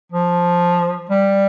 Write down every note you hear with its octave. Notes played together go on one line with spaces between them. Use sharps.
F3
G3